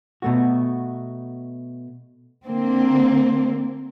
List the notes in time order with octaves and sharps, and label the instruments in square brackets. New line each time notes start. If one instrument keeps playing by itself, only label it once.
[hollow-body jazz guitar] B2 A3 F#4
[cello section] D3 A#3 C4